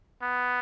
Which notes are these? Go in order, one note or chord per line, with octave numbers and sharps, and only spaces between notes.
B3